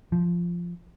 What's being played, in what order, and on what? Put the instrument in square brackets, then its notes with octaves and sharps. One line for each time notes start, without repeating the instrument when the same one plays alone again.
[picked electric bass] F3